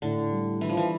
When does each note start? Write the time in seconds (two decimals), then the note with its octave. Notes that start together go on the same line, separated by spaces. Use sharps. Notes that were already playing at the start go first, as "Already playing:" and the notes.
0.02 A2 D3
0.32 G3
0.61 E3 D4
0.69 F3
0.77 E3